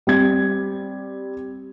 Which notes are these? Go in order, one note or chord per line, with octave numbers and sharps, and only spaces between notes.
G3 C4 G#6